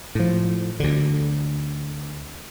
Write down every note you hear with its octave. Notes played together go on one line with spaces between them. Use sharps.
A2 F3
D2 D3